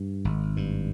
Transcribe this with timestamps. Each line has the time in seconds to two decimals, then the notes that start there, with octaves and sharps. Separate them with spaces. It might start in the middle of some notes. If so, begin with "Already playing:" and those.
Already playing: G2
0.25 G#1
0.57 G2